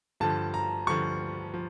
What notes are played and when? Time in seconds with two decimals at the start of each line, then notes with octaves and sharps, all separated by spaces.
0.20 G2 D3 F3 A5
0.54 A#5
0.87 G2 D3 F3 C#6
1.54 F3